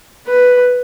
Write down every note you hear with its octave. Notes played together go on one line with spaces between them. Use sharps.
B4